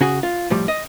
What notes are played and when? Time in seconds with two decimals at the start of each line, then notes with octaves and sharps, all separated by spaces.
0.01 C#3 F#4 G#4
0.23 F4
0.50 A2 F3 G3
0.68 D#5